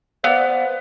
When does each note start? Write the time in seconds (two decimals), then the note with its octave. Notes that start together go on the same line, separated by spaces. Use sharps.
0.24 B3 C5 D5 F5